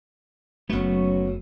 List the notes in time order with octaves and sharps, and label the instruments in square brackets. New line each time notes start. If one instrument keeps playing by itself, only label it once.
[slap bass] F#1 A3 [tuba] F#3 [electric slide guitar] B3 C#4 F#4